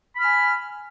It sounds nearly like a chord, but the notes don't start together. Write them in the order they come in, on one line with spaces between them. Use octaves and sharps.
B5 F6 G#5